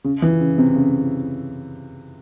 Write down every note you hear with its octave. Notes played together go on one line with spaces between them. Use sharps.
C#3
E3
C#3
C3
C#3